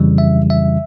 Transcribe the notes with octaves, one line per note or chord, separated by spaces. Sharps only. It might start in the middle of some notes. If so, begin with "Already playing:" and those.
Already playing: F2 C#3 E3 G3
E5
E5